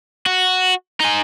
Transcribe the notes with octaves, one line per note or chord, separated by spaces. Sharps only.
F#4
D#4 G#4